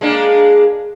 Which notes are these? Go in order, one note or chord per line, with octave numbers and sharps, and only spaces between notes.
G#3 A#3 D4